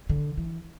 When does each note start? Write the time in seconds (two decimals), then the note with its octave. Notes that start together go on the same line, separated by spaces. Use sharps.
0.09 D3
0.37 E3